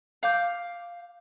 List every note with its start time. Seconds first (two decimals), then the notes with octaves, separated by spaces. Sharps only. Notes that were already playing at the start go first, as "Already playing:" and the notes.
0.23 F5 D6 G6